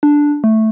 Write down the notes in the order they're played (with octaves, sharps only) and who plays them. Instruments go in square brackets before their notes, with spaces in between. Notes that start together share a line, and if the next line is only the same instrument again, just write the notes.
[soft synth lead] D4
A3